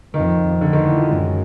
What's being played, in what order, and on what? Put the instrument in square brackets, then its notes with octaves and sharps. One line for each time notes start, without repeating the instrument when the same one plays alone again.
[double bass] F2 [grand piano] D#3
[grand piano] D3
D#3
E3
F3
[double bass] F#2 [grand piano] G#3